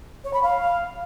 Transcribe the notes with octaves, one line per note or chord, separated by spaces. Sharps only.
C#5
B5
F5